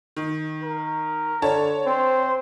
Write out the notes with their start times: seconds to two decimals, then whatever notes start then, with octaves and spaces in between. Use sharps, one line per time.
0.17 D#3
0.63 A#4
1.42 D3 C#5 A5
1.86 C4 C5